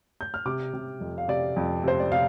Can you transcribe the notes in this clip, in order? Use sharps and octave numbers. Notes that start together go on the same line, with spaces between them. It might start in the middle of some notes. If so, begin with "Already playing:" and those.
G6
F6
C3 D6
C3
F2
F5
C3 D5
F2
C3 C5
D5
C3 F5